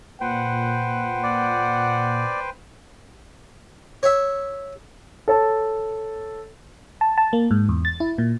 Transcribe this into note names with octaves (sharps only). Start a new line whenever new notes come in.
A#2 B4 C5 F#5 G5
D5
C#5 E5
A4 C#5 A5
A5
A5
A#3
G#2
E2
A6
E4
A#2